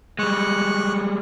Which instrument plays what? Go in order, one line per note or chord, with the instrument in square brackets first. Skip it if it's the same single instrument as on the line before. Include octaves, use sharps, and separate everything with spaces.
[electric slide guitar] G3 G#3 [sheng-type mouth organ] C#6 F#6